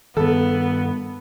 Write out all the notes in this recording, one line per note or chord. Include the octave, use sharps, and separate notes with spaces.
G2 D#3 B3 A4